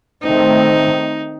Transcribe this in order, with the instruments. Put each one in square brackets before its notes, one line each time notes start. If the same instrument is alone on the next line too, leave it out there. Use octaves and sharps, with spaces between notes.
[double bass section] D#3 A3 C4 [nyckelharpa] D#4